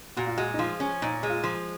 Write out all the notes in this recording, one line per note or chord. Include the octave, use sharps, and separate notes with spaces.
A#2 F#4
F4
G#3 F#4
D#4
F3 F4
C#4
A#2 D#4
G#3
F4
F3